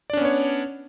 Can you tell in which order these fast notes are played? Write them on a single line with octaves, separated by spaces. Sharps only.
D5 D4 C#4 B3 C#5